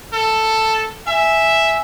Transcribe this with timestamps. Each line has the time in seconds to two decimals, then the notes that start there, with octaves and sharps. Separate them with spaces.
0.13 A4
1.07 E5 G#5